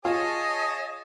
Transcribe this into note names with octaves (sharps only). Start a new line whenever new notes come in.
F4 G#4 C#5 D#5 A5 D#6